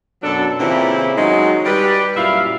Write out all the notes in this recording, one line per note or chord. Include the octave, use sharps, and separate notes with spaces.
F#2 B2 F#3 D4 A4
A#2 C#3 E3 C4 E4 G4
D#3 F#3 G#3 D#4
G3 G4 B4
F#2 A#2 E4 E5 F5